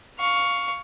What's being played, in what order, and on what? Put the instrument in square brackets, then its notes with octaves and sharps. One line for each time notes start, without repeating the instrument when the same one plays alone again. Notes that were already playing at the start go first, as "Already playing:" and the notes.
[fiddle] F5 C#6